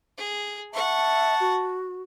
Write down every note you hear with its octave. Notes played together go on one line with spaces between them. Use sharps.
G#4
E5 F#5 A5 C#6
F#4